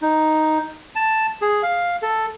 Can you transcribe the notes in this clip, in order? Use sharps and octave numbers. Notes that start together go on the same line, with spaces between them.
D#4
A5
G#4
F5
A4